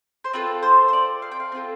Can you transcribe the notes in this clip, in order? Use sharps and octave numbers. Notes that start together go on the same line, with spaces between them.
C5
C4 F4 A4 B4
C5
C5
D5
F5
G5
F5
C4 F4 A4